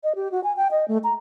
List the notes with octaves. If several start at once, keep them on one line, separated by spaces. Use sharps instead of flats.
D#5
G4
F#4
G#5
G5
D#5
A3
A#5